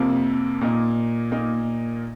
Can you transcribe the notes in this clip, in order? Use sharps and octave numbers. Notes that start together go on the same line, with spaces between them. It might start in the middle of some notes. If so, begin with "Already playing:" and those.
Already playing: F2 C3 F3 A#3
A#2 A#3 D#4
A#2 A#3 D#4